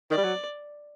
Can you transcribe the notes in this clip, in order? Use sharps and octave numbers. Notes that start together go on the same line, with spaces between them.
D#3 D5
G3
F#3